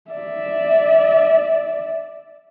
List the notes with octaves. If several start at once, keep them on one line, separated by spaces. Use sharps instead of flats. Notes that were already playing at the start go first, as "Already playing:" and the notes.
D5 E5